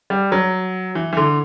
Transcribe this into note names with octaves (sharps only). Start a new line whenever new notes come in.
G3
F#3
E3
E3
D3